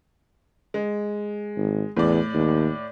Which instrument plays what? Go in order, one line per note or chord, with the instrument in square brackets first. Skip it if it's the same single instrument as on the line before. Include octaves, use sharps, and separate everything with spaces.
[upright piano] G#3
[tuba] G#1
[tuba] E2 [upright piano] A2 D5
[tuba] D#2